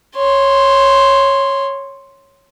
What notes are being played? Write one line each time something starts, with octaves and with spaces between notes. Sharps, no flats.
C#5 C6